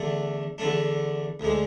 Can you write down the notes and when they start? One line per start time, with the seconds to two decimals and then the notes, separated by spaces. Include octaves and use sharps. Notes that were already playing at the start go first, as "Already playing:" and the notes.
Already playing: E2 D3 A3 D4
0.58 E2 D3 A3 D4
1.40 D2 D3 G#3